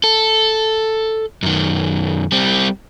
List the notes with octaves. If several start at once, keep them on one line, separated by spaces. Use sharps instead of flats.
A4
F#2 D#3
G3 C4